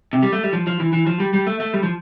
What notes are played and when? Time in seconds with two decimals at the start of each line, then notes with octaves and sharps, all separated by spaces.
0.13 C3
0.23 G3
0.32 A3
0.43 G3
0.53 F3
0.67 F3
0.80 E3
0.93 E3
1.06 F3
1.20 G3
1.33 G3
1.47 A3
1.60 A3
1.74 G3
1.83 F3